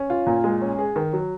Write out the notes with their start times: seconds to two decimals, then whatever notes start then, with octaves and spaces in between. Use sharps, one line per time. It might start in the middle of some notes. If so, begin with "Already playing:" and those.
Already playing: C#4
0.10 F4
0.27 A#2
0.44 G#3
0.62 C#4
0.79 G#4
0.96 D#3
1.13 F#3